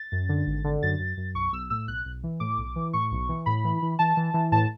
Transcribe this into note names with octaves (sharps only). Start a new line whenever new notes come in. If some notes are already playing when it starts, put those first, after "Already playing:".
Already playing: A6
F#2
D3
G#1
D3
F#2 A6
F#2
F#2
B1 C#6
B1 E6
A2 E6
B1 F#6
B1
E3
A2 D6
B1
E3
A2 C#6
B1
E3
A2 B5
E3
E3
E3 A5
E3
E3
A2 A5